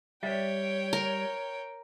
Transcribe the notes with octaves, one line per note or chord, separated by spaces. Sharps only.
G3 C#5 D5 E5 G5
A#4